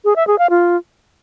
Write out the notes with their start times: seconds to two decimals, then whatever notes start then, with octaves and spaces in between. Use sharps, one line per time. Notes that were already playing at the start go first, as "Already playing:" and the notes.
0.05 G#4
0.16 E5
0.27 G#4
0.39 F5
0.50 F4